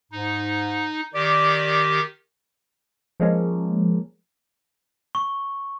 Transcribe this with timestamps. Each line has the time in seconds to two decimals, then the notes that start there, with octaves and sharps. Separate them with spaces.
0.12 G#2 D#4
1.14 D#3 G4 D5
3.20 F3 G#3 A#3 C#4
5.15 C#6